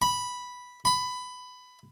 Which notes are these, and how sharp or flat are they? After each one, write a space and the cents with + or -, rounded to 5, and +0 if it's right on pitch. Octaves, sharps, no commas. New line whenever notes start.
B5 -5
B5 +15